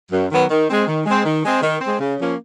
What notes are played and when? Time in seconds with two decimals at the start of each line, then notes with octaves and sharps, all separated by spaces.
0.11 F#2
0.30 D#3 F#3 B3
0.50 D#3
0.69 G#3 C4
0.87 D#3
1.06 G#3 C4
1.25 D#3
1.44 G#3 C4
1.62 D#3
1.81 G#3 C4
2.00 C#3
2.20 F3 A#3 C#4